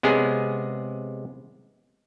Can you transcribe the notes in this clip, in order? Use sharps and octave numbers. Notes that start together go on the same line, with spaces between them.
C3 G#3 B3 C#4 G#4